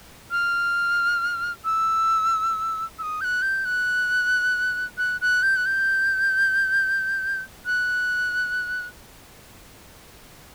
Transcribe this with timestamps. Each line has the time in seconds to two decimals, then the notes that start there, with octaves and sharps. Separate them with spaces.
0.31 F6
1.65 E6
2.99 E6
3.03 D#6
3.21 G6
3.24 F#6
3.42 G6
3.65 F#6
4.98 F#6
5.21 F#6
5.43 G6
5.56 F#6
5.66 G6
7.66 F#6